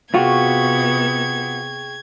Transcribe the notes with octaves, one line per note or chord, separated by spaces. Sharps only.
C3 B3 F4 F#4 G#4 G5 C#6 G#6